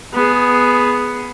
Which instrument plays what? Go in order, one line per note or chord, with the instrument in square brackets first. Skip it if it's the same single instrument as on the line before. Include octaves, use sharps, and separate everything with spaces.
[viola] B3 G#4